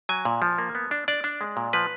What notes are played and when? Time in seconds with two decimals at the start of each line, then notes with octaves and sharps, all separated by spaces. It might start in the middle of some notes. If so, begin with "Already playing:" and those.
0.09 F#3 G#5
0.25 A#2
0.42 F3
0.58 A#3
0.75 B3
0.91 D4
1.08 D4 D5
1.24 D4
1.41 G#3
1.57 A#2
1.73 F3 B4